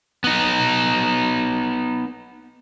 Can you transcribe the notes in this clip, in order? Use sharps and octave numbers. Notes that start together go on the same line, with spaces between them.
B3 D#4